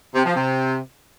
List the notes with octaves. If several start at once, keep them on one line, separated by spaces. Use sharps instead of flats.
C3
F3
C3